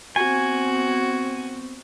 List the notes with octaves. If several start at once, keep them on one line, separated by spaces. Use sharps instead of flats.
B3 C4 F#4 G#5